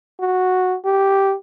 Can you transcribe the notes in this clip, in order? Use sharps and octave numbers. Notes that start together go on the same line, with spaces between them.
F#4
G4